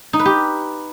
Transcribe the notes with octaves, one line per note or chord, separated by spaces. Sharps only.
D#4
B4
G4